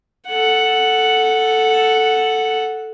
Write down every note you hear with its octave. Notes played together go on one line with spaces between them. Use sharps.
A4 F#5